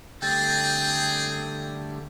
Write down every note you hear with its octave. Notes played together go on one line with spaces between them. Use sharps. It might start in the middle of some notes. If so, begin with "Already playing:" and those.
D3 G3 A3 C4 G#4 G5 G6 A6